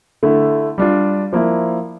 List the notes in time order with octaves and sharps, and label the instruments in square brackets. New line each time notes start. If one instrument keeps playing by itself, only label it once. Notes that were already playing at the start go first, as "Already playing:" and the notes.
[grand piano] D3 A3 E4
G3 D4 F4
F3 A#3 E4